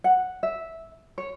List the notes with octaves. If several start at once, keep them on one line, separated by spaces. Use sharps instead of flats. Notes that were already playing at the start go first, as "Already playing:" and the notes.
F#5
E5
C#5